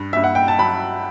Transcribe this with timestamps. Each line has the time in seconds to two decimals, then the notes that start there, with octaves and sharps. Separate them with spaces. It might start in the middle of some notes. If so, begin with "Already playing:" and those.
Already playing: G2
0.13 G2 E5
0.24 F#5
0.35 G5
0.48 A5
0.58 F#3 B5